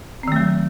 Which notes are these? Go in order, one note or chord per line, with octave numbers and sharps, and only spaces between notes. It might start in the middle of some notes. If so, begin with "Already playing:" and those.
D#3 F#3 A3 C4